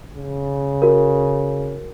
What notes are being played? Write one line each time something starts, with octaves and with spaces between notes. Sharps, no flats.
C#3
F#4 A#4